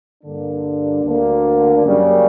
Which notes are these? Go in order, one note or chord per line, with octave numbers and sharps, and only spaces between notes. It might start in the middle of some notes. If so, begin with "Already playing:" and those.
G2 D3 A#3 D4
D2 D3 A#3
F#2 C#3 G3 A#3